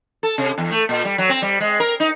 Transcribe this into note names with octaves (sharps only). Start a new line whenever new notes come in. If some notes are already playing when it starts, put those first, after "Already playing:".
A4
C3
E2
A3
A#2
G3
F#3
C4
G3
G#3
A#4
D#4